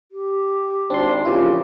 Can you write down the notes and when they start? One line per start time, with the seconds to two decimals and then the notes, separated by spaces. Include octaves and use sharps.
0.11 G4
0.90 G#1 C4 D4 C6
1.25 E2 A#2 C#3 F3 E4 G4